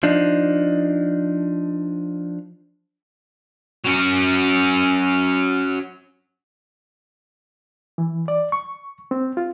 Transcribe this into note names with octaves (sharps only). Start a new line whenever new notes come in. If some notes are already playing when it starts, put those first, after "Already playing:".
F3 D4 D#4
F#3 C#4
E3
D5
C#6
C4
F4